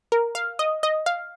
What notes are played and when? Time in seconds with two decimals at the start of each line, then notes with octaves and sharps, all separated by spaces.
0.12 A#4
0.35 F5
0.59 D#5
0.83 D#5
1.06 F5